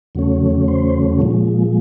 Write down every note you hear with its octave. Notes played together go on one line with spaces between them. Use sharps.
E2 C#3 F#3 A3 C#4
C5
A#2 F3 G#3